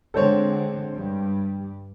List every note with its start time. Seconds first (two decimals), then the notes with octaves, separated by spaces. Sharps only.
0.14 D3 G#3 C4 A4 C5 C#5
0.93 G2 G3